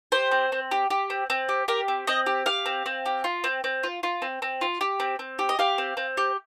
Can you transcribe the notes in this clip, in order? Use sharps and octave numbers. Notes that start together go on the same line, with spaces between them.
G4 C5
C4
C4
G4
G4
C4
C4
G4
G4 A#4
C4
C4 D#5
G4
G4 F5
C4
C4
G4
F4
C4
C4
F4
F4
C4
C4
F4
G4
C4
C4
G4
D#5
G4 F5
C4
C4
G4